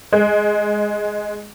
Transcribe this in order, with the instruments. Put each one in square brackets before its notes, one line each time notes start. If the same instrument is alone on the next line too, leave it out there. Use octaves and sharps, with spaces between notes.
[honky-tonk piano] G#3